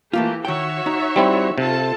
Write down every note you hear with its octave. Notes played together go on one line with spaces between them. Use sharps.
E3 A3 A#3 F4 G4
D#3 F#4 C#5 E5 G5
D#4
G3 C4 E4
C3 F4 A4 A5